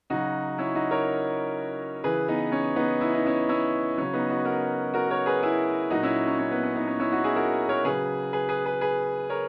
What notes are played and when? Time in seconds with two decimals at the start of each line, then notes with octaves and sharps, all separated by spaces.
0.10 C#3 F#3 D#4 F#4
0.58 C#4 E4
0.75 D#4 F#4
0.91 A#4 C#5
2.04 C#3 E3 G#4 B4
2.28 B3 D#4
2.52 C#4
2.76 B3 D#4
3.01 E4
3.13 D#4
3.26 C#4 E4
3.49 C#4 E4
3.98 C#3 F#3 C#4
4.13 B3 D#4
4.30 D#4 F#4
4.45 F#4 A#4
4.94 F#4 A#4
5.10 A#4 C#5
5.26 G#4 B4
5.43 E4 G#4
5.90 A#2 F#3 D#4 F#4
6.03 C#4 E4
6.27 C#4
6.39 C#4
6.51 B3
6.63 C#4
6.75 B3 D#4
6.87 C#4
7.00 C#4 E4
7.12 D#4 F#4
7.24 E4 G#4
7.36 F#4 A#4
7.69 A#4 C#5
7.84 C#3 F#3 G#4 B4
8.33 G#4 B4
8.49 G#4 B4
8.65 G#4 B4
8.81 G#4 B4
9.30 A#4 C#5